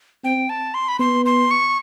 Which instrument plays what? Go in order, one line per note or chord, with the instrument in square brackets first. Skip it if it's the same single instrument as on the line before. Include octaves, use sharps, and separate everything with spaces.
[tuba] C4 [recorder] G5
[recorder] A5
C6
B5
[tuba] B3 [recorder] C6
[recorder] C6
C#6